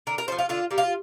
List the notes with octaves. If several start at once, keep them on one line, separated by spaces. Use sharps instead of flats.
D3 A#4
A#4
F3 A3 C5
F4
D3 F4
G3 A#3
F4